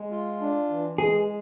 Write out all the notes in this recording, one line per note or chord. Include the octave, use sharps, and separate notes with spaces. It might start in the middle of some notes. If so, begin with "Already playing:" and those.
Already playing: G#3
F4
D4
E3
G#3 G#4